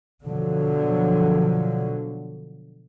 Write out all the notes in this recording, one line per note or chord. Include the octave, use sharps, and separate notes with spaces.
B2 D3 F3 F#3